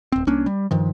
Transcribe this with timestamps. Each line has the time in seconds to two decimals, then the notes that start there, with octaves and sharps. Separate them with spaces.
0.12 D1 C4
0.27 C2 A#3 C#4 D4
0.46 G3
0.71 G2 D#3 F3